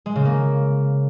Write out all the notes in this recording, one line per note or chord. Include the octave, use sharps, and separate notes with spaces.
G#3
C#3
A#3